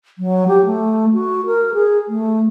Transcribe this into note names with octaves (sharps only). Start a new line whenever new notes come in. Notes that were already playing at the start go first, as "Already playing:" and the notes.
F#3
G4
A3
F#4
A#4
G#4
A3